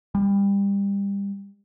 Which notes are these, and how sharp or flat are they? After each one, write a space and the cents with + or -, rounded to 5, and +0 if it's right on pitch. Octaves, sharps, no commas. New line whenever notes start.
G3 +25